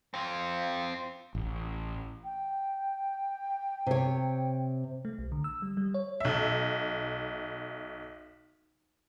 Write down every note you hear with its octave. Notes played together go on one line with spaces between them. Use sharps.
C4 F4
A1
G5
C3 C#5
A3
B1
D3
E6
G3
G3
C#5
B1 E5